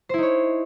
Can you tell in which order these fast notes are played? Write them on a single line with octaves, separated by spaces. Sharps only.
C5 E4 D#4 C#5